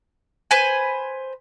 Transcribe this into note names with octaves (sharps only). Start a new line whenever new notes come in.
B4 C5 G#5